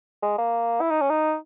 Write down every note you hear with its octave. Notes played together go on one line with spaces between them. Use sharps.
G#3
A#3
E4
D#4
C#4
D#4